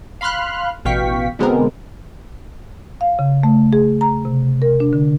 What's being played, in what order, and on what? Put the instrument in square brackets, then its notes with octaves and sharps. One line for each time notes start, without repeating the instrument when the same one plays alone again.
[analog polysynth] F5 B5 C6 F6 F#6
A1 B2 F5 G5 C#6 B6
B2 D3 G#3 B3 C4 A#4
[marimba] F5
C#3
A3
G#4
A#5
C3
A#4
D4
D3